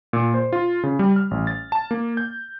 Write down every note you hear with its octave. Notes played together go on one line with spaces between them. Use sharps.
A#2
C5
F4
C#3
G3
F6
A1
A6
A5
A#3
G6